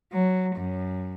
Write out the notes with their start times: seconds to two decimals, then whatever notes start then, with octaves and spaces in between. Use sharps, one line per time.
0.13 F#3
0.55 F#2